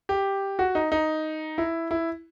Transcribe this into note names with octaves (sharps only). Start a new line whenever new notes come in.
G4
F#4
D#4
D#4
E4
E4